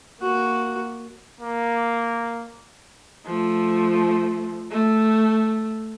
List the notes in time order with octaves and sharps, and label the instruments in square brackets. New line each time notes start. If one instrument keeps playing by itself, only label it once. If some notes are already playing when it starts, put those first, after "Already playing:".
[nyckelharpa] A#3 F#4
[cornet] A#3
[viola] F3 A3
A3